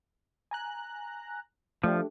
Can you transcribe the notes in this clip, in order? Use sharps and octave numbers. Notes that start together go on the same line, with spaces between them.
G#5 A#5 F#6
F3 A3 D4 G4